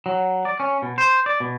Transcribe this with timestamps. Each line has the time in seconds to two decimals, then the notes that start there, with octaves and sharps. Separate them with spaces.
0.06 F#3
0.45 D5
0.60 C#4
0.82 B2
0.98 C5
1.26 D5
1.40 B2